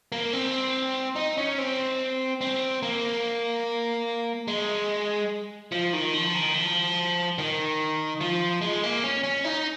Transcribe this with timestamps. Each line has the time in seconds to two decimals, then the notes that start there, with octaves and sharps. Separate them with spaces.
0.12 A#3
0.33 C4
1.16 D#4
1.37 C#4
1.58 C4
2.41 C4
2.82 A#3
4.48 G#3
5.72 F3
5.93 D#3
6.14 F3
6.34 D#3
6.54 F3
7.38 D#3
8.21 F3
8.62 G#3
8.83 A#3
9.04 C#4
9.24 C#4
9.44 D#4